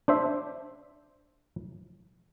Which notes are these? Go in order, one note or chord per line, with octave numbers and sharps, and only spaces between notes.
D4 C5 E5